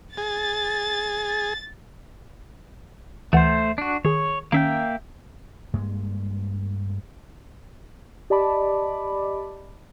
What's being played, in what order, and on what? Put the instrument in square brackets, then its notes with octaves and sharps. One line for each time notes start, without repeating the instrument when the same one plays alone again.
[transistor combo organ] G#4 [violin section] A6
[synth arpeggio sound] D2 E3 F#5 [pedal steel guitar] A3 C5
[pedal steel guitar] D4 F#4
[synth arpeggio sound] D#3 G#4 [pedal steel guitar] C#5
[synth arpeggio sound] D#3 C#4 [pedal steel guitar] A#3 E5 G5
[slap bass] G2 G#3 A#3
[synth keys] G4 D5 D#5 A5 B5 D6